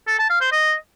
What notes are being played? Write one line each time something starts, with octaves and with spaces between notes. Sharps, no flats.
A4
A5
F5
C5
D#5